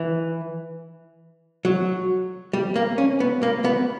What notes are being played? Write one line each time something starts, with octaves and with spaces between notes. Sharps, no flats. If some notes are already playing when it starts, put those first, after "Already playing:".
Already playing: E3
F#3
G3
A#3
C#4
B3
A#3
B3